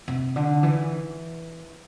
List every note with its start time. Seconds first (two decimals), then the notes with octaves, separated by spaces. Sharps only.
0.08 C3
0.36 D3
0.63 E3